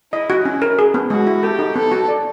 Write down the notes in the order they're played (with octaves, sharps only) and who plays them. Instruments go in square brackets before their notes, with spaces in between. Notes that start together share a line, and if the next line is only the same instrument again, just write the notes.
[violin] E4 [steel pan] D#5
[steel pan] F#4
[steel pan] C#4 [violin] E4
[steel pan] A#4
G#4
B3
[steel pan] G#3 [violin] F#4
[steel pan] E4
[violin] G4 [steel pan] A4
[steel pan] D#4
[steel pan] B3 [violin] A4
[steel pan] F#4
D5